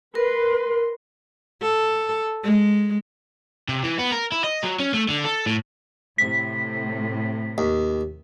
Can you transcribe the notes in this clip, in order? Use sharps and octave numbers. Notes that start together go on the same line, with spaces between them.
A#4 B4 C6
A4
G#3
C3
E3
B3
A#4
E4
D#5
F#3
C#4
A3
D3
A4
A2
A2 C3 B6
D#2